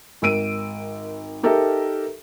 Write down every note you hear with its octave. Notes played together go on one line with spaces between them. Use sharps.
G#1 A#4 E6 D7 D#7
D#4 G4 A4 A#4 E5